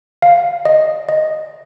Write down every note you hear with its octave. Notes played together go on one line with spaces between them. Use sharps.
F5
D#5
D#5